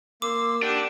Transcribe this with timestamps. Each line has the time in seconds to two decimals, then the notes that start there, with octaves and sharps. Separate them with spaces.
0.22 A#3 C6 D6 E6
0.62 D4 G4 F#5 E6